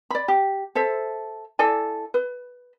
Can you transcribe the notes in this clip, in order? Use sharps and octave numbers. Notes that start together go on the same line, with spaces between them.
D5 B5
G4
A4 C5 E5
E4 A4 D5 G#5
B4